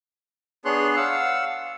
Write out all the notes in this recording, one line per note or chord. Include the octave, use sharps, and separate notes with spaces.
B3 D4 G#4 C#5 C6 F#6
F5 F#5 E6